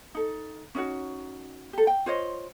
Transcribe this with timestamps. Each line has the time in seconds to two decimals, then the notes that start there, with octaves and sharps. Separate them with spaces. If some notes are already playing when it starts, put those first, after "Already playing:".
0.15 D#4 A4
0.75 C#4 D#4 F4 F#4
1.73 G4 A4
1.87 G5
2.06 F4 C5 C#5 D#5